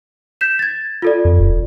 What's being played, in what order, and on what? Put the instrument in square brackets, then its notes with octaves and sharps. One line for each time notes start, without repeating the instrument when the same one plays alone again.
[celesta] G6 B6 E7
G#6 A6
F4 A4 D5
[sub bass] F2
D#1